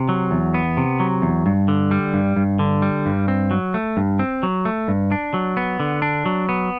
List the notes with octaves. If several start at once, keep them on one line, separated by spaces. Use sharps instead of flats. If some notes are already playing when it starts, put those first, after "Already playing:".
Already playing: C3
F#3
E2
B3
C3
F#3
E2
G2
D3
G3
G2
G2
D3
G3
G2
C4
F#3
A3
G2
C4
F#3
A3
G2
D4
F#3
B3
D3
D4
F#3
B3